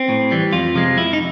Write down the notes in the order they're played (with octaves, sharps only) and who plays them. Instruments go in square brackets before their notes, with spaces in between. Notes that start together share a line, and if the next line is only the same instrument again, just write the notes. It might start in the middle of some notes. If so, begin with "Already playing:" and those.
Already playing: [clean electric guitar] C4
A2
E3 G3
F2 F4
C3 F3 G#3
F2 E4
D#4